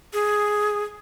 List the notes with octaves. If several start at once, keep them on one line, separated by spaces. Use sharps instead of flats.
G#4